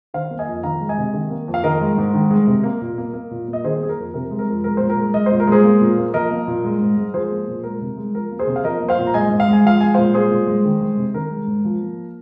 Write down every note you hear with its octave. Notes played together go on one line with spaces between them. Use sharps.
D#3 C5 F5
A#3
D#5 G#5
F2
D#3 F5 A#5
G#3
D#5 G#5
C3
D#3
A#3
F2
F5
D#3 A#4 D#5
G#3
G#2
D#3
G#3
C3
A#3
A#2
A#3
A#3
A#2
A#3
D#5
D#3 G#4 C5
A#3 G#4
A#4
F2
C3 A#4
G#3
A#4
F2
G#3 A#4
A#2 C5
A#4
G#3
G#3 D#5
A#2 C5
A#4
G#3 G#4 C5
A#3
A#2
A#3
F3 A#4 D#5
A#3
A#2
G#3
G#2
G#3
F3 G#4 C5
A#3
A#2
G#3 A#4
C3
G#3
F3 A#4
A#3
G#4 C5
C3
F5
F3 A#4 D#5
A#3
C5 F5
A#2
A#5
G#3 D#5 G#5
G#2
F5
G#3 G#5
F3 F5
G#3 G#5
A#2 C5 F5
G#3 G#4 C5
A#2
G#3
D#3
G#3
C3
D#3 A#4
G#3
G#2
F3
A#3